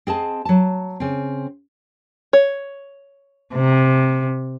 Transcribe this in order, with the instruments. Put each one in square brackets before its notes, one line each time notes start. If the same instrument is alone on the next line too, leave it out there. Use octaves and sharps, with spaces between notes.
[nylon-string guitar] C4 G#4 D#5 A5
F#3 A5
C#3 C4
[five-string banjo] C#5
[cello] C3